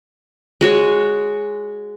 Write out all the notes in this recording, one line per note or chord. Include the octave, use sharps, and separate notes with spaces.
G#3 F#4 C#5